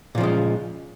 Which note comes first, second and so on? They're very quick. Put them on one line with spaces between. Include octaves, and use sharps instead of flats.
A#2 F3 C#3 G#3